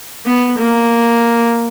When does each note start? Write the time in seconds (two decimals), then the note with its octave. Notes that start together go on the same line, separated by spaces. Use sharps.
0.26 B3
0.58 A#3